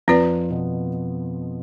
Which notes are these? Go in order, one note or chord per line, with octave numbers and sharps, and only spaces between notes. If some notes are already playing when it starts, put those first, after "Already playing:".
F2 F3 C4 F4 B4 D5
B2 B3